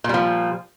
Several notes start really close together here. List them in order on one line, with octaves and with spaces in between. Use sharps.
A#2 G3 F3